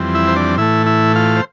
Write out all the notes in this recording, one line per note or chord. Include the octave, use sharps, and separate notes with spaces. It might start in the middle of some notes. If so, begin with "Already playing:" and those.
Already playing: F2 E3 G3 C4
E4 E5
C5
D4 D5
A2 E3 A3 E4 E5
E4 E5
F4 F5
C5